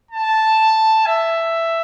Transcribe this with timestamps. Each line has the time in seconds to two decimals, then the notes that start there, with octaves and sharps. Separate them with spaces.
0.11 A5
1.06 E5